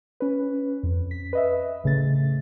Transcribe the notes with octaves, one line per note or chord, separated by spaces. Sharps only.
C#4 B4
F2
B6
B4 D#5 E5
A1 C#3 A3 A6